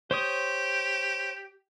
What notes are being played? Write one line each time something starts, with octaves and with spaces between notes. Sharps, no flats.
G4 C5 C#5 D#6